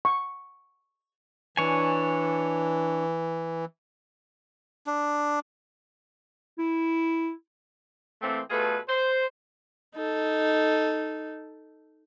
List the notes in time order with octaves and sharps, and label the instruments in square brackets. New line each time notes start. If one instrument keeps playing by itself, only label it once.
[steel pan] C#6
[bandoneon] E3 [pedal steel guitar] D4 C#5 G#5
[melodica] D4
[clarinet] E4
[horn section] E3 A3 A#3 C4
B2 A3 F4 G#4 A4 B4
C5
[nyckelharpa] D#4 A4